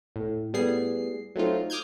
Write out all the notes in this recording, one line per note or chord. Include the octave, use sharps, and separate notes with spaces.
A2
A2 G3 B3 G#4 C7
F#3 A3 C4 D#4 F4
D6 D#6 F6 G6 G#6